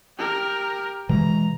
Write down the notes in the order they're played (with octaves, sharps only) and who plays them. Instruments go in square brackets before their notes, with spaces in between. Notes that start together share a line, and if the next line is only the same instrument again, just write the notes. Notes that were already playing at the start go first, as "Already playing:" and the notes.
[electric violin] G4 A#4
[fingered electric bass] B2 E3 G#3 [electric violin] A#5